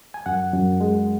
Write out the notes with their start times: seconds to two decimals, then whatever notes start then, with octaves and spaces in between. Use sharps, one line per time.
0.14 G#5
0.26 F#2 F#5
0.54 F#2
0.81 G#3